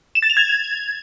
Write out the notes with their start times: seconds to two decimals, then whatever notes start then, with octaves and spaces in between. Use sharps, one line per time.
0.15 E7
0.22 A6
0.30 F7
0.37 G#6